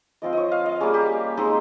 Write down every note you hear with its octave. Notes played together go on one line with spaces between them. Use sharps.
F3 C4 F4 D#5
C#5 D#5
F5
D#5
G3 A#3 C#4 G#4
G4
G#3 C4 D#4